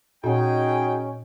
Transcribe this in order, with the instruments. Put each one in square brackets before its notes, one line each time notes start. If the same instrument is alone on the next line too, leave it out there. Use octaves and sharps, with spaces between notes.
[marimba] A#2 [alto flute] C#4 [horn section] D#4 G#4 G5 [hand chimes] F#4 D#5 F#5